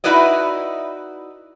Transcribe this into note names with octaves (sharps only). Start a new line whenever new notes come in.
D#4 E4 F#4 B4 D5 D#5